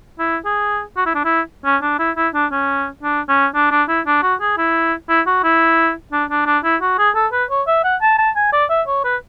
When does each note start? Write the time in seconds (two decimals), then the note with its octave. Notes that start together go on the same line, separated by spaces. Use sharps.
0.19 E4
0.45 G#4
0.97 F#4
1.06 E4
1.15 D4
1.25 E4
1.65 C#4
1.82 D4
1.99 E4
2.16 E4
2.34 D4
2.52 C#4
3.03 D4
3.29 C#4
3.55 D4
3.71 D4
3.89 E4
4.06 D4
4.23 F#4
4.41 G#4
4.58 E4
5.09 E4
5.27 F#4
5.44 E4
6.13 D4
6.30 D4
6.46 D4
6.64 E4
6.82 F#4
6.98 G#4
7.15 A4
7.32 B4
7.50 C#5
7.67 E5
7.84 F#5
8.02 A5
8.18 A5
8.36 G#5
8.53 D5
8.70 E5
8.88 C#5
9.05 B4